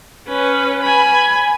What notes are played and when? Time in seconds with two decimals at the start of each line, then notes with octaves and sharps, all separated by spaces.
0.28 C#4 B4
0.82 G#5 B5